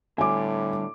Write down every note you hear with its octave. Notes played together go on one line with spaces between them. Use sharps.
A2 D3 G3 G#5 D6